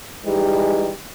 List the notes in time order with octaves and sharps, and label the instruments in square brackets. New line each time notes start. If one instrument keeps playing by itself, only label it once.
[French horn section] E3 G3 G#3 D#4 G4